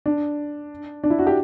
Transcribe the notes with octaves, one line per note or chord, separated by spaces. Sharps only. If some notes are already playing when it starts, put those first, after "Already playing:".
D4
D4
E4
F#4
G4